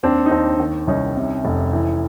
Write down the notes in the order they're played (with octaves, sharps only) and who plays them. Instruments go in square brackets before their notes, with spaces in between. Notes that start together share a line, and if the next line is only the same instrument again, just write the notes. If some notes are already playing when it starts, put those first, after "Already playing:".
[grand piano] D#2 C4 D4
D#4
D#2 C4 D4
D#3
C2 C#4 D#4
C3
F1
E3